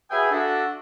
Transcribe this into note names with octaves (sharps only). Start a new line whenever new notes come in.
F#4 G#4 B4 E5 G5 G#5
D4 F#4 A4 E5